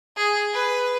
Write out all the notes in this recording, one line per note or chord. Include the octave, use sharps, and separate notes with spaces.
G#4
B4